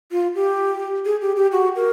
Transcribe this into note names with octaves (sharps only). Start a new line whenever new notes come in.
F4
G4
G#4
G4
G4
F#4
A#4